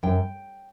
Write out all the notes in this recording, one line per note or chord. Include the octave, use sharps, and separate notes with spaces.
F#2 G5